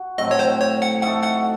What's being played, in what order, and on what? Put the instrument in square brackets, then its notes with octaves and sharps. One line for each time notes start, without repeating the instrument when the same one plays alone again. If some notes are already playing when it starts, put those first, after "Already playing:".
Already playing: [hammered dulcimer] F#4
[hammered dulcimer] A2 F#3 A3 C4 [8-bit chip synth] D#5
[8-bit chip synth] C#5
C5
C#5
F#5
[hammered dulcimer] A3 D#4 F#4 A4 [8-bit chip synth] F#5
[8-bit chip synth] F#5